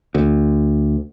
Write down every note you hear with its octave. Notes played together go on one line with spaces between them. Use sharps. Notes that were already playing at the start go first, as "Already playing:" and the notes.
D2